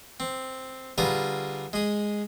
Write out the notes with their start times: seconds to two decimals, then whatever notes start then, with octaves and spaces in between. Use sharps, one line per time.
0.20 C4
0.98 D3 G3 F4 G#4 A#4 B4
1.73 G#3 G#4